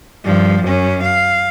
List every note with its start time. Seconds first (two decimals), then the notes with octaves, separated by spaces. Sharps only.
0.24 G2 F3
0.64 F#2 C#4
1.03 F5